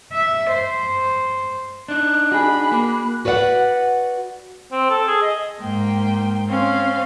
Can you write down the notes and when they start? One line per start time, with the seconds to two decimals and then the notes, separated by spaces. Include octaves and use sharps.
0.12 E5
0.52 C5
1.88 D4 D#4 F#6
2.32 F#4 G#4 B5
2.72 A#3
3.25 F#4 B4 D5 E5 F#5
4.72 C4
4.90 A4
5.08 G#4
5.22 D#5
5.59 G#2 A#3 G5 C6
6.47 C4 C#4 F5 C6